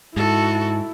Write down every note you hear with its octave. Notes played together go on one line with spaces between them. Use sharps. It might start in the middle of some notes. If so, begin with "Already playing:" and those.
G#2 E4 F#4 A4